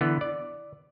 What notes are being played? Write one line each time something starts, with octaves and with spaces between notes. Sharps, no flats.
D3 E3 B3 B4
D5